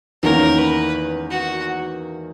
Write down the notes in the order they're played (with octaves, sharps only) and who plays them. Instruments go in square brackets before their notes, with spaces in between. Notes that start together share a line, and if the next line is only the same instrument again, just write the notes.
[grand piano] E2 D#3 A#3 C#4 [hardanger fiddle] A#4
[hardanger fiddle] B4
F#4